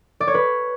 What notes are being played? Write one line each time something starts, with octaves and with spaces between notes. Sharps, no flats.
D5
C#5
B4